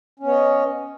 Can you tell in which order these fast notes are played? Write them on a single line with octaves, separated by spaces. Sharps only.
C#4 B3 C#5 D#5